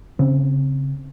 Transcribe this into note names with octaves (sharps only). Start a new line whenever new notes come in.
C#3 C4